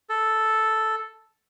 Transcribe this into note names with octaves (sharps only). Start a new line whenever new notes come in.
A4